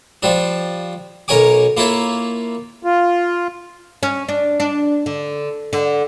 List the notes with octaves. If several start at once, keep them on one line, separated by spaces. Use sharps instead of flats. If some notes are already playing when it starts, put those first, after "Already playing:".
F3 G3 D4
B1 A#4 C#5 G#5 D6
A#3 E4 F4 C#5
F4
C#4
D4
D4
D3
D3